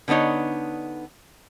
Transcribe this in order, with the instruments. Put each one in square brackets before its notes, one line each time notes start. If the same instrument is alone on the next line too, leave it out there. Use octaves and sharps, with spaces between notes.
[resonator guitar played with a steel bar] D3 B3 D4 D#4 C#5